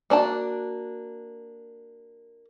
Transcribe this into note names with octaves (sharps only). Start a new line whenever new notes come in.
A#3 D4 F#4 A5